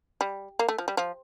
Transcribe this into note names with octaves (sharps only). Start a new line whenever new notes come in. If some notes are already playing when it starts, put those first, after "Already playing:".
G3
A#3
A3
F3
G3
F3